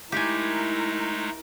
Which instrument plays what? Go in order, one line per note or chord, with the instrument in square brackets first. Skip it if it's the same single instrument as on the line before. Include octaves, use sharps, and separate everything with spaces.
[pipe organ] G#3 A3 D#4 [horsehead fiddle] E4 A#4 [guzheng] G4 G#5